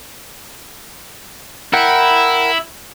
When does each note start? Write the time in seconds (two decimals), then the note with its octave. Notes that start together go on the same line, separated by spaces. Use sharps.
1.73 E4 A#4 F#5 G5